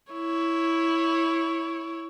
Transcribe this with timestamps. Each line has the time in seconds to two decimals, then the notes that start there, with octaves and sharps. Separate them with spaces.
0.12 E4 C#5